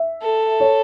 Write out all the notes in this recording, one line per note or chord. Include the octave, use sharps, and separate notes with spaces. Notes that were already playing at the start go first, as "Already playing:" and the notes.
Already playing: E5
A4
C#5